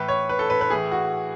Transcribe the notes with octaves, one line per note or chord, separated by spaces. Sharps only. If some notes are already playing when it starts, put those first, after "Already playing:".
Already playing: A2 E3 B4
C#5
B4
A4
B4
B4
A2 E3 G#4
F#4